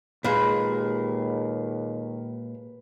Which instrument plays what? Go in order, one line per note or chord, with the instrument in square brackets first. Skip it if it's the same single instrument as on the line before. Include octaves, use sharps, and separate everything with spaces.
[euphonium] D#2 [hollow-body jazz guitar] A#2 G#3 [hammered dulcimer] B4